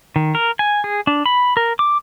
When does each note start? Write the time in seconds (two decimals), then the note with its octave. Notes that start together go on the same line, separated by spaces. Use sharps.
0.16 D#3
0.35 A#4
0.59 G#5
0.84 G#4
1.07 D4
1.26 B5
1.57 A#4
1.79 D6